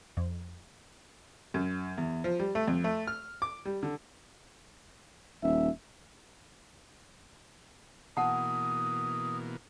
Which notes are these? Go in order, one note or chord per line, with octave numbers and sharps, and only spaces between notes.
F2
F#2
E2
F3
G3
A3
F2
A3
F6
D6
G3
D3
D#1 E5
B2 E3 A#3 F#5 A5 D#6